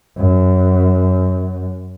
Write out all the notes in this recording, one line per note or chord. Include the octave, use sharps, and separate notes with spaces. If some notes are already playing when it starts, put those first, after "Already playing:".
F#2